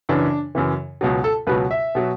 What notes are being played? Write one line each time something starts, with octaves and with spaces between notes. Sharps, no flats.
F#2 C#3 E3 D4
F#2 C#3 E3
C#2 B2 F#3
A4
C#2 B2 F#3 B4
E5
B2 F#3